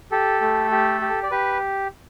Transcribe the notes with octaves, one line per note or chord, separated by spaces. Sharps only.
G4 A4
A3
G4
G4
D5
G4 B4